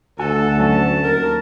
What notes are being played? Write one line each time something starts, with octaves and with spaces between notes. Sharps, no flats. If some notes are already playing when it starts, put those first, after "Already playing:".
D2 F#4 A4 G#5
F#3 C#4 A5
D#2 A#4